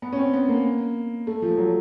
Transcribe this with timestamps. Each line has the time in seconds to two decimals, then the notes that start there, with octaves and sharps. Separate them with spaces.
0.02 B3
0.13 C#4
0.18 C4
0.33 B3
0.49 A#3
1.27 A3
1.42 F3
1.58 F#3